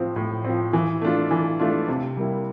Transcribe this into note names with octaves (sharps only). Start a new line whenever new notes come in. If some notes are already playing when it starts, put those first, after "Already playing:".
Already playing: A2 F3 C4
A2
F3 C4
E3
A3 D4 F4
E3
A3 D4 F4
C3
G3 A#3 E4